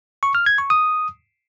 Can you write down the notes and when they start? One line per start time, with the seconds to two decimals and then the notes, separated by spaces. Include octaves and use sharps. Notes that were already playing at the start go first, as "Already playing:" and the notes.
0.23 C#6
0.35 F6
0.46 G#6
0.58 C#6
0.70 D#6